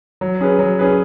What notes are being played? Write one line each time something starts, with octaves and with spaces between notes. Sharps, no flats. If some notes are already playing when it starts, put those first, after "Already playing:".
F#3
C#4 G#4 B4
F#3
C#4 G#4 B4